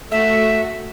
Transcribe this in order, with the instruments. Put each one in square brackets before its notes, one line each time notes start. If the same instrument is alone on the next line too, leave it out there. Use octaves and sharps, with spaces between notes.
[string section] A3 F#4 [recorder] E5